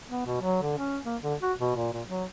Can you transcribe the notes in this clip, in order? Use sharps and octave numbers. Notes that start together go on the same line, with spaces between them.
B3
B2
F#3
D3
C#4
A#3
D3
F#4
B2
A#2
A#2
F#3